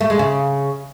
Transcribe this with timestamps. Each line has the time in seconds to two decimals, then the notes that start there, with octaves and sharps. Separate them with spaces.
0.01 A3
0.10 G#3
0.19 C#3